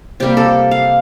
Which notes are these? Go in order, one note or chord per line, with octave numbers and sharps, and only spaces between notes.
C3 G3 A#3 G4
A4
F5